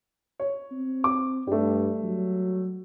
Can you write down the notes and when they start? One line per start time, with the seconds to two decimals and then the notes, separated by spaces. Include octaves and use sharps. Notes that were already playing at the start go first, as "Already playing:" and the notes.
0.40 C#5
0.72 C4
1.04 D6
1.47 G2 G3 A3
2.04 F#3